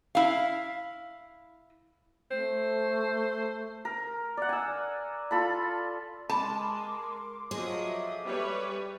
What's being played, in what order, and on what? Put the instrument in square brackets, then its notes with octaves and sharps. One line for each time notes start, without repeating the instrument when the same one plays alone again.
[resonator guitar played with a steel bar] E4 F5
[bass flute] A3 [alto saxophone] C5
[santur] A#4
D5 F#5
G#5 E6
F4 A4 B5
[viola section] G#3 [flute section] A#4 C6 D6 [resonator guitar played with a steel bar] A5
[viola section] F3 F#3 D#5 [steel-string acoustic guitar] G#4
[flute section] A4 E5 D6
[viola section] G3 B4 C#5